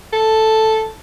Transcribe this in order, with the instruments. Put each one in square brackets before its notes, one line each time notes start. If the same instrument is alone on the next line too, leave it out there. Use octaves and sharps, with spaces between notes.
[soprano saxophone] A4